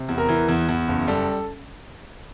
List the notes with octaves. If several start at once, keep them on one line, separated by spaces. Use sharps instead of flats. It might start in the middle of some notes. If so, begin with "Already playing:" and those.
Already playing: C3
E2
A#4
E3
E2
E2
F#1
G3 A4